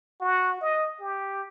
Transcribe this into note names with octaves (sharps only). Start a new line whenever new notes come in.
F#4
D#5
G4